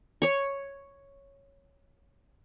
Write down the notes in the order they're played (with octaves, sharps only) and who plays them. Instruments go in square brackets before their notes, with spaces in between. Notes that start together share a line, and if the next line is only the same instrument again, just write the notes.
[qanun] C#5 C#6